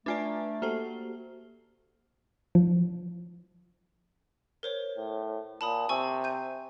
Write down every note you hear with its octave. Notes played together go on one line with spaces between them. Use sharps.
A3 D4 F4 B4 D5 G#5 A#5
A#3 F#4 G4 A4 C5
F3
A#4 C5 C#5
A2
A#2 A5 B5 D#6
C3 G#5 C#6 E6
G6 D#7